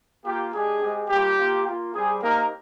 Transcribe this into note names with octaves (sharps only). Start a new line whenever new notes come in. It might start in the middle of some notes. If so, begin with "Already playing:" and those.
A#3 F4 G4
G#3 D4 G4 G#4
G#3 C4 G4
G3 A#3 F4 G4
A#3 F4
A#3 F4
G3 C4 G4 G#4
A#3 C4 D#4 G4 A#4